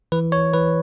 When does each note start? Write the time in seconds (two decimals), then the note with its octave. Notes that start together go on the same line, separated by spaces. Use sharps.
0.12 E3 B4
0.32 C#5
0.53 E3 B4